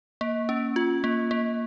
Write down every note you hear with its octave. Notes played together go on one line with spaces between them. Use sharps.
A#3
C#4
F4
A#3
A#3